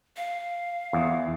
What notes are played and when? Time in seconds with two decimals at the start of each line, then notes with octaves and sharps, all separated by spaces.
0.17 F5
0.93 E2